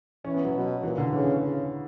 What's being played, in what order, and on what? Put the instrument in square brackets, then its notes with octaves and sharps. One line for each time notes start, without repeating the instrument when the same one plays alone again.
[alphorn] E3 [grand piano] C#4
[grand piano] B3
F#3
[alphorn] B2
[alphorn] A#2 [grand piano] E3
[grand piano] D3
[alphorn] C#3 [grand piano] E3
[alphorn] C#3